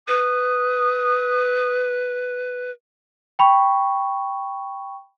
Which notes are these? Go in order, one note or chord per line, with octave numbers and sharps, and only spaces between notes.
B4 D#6
G5 B5 C#6